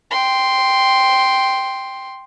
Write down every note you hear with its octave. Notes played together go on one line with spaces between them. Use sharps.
G5 C6